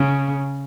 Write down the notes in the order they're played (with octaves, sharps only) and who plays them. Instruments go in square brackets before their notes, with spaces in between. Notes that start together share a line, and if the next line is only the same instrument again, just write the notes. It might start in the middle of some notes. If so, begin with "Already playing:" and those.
Already playing: [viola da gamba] C#3